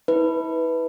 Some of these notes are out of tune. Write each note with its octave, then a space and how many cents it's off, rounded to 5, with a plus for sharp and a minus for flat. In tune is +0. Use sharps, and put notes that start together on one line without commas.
E4 -35 B4 +0